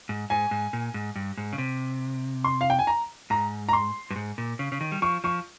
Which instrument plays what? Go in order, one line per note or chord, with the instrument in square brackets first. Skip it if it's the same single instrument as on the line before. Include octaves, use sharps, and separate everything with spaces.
[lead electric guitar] G#2
[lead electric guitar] G#2 [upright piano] G#5
[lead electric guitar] G#2
A#2
G#2
G2
G#2
C#3
C3
[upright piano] C6
F5
G5
G#5
A#5
[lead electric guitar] G#2 [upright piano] A#5
[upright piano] A#5
C6
[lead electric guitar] G2
G#2
A#2
C#3
C#3
D#3
G3
[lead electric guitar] F3 [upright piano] C#6
[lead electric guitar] F3 [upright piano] C#6